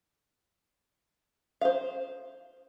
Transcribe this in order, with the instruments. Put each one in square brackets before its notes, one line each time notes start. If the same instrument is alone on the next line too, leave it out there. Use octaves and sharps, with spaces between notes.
[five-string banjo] C5 F5